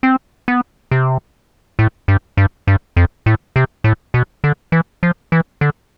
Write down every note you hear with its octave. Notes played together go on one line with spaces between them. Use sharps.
C4
B3
C3
A2
G2
G2
G2
F2
A2
C3
A2
B2
D3
E3
F3
E3
D3